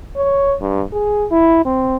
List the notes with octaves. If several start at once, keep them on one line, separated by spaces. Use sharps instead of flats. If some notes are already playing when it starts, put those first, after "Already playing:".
C#5
G2
G#4
E4
C4